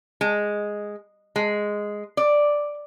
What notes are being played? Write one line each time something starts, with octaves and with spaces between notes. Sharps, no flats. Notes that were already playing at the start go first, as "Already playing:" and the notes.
G#3
G#3
D5